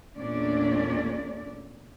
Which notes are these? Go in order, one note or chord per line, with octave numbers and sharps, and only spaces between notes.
E2 A#2 A3 C#4 D4 D5